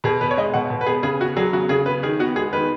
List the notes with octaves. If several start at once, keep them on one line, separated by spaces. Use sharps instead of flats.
B2 G#4
B3 B4
C#5
G#3 D#5
B2 F#5
B2
B4
B3 G#4
C#3 G#4
B3 F#4
F#3 G#4
C#3 F#4
C#3 G#4
B3 B4
D#3 G#4
B3 F#4
G#3 G#4
D#3 B4